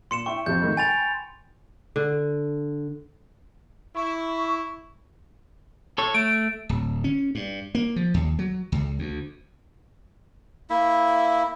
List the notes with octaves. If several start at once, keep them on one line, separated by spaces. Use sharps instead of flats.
A#2 C6 C#7 E7
E4 E5 G5 C#6
F2 C3 F3 G6
G#2 D#3 A3
G5 G#5 B5 A6 D7 F7
D3
E4 C#6
A4 C#5
A3 D7
D1
C#4
G2
A#3
F3
D#2
F#3
C#2
D2
A#3 E4 E5